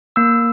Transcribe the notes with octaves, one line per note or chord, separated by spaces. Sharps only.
A#3 E6